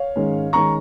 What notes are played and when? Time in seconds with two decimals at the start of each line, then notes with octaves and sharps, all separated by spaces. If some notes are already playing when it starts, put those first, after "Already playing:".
Already playing: C#5 F5
0.16 G#2 D#3 G#3 C#4
0.52 D#3 G#3 C#4 A#5 C#6